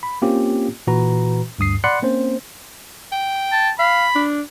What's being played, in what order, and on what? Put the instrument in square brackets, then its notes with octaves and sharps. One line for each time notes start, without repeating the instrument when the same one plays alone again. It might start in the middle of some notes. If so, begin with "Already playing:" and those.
[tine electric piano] B5
A#3 C4 C#4 F4 G4
A#2 E3 F#4 B4 A#5
D2 G2 D#6 C7
D5 F#5 B5 C6 F#6 C#7
A#3 C4 C#4 C5
[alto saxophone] G5
[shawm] A5
[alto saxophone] F5 [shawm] B5
[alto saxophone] D4